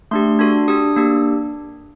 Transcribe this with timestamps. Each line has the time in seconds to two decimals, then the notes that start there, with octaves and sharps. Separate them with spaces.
0.11 A3 D4 G4 C6
0.39 D4 F#4 A4 C6
0.68 D4 G4 D#6
0.96 A#3 D4 G4